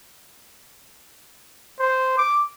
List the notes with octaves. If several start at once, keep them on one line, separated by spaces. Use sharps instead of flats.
C5
D6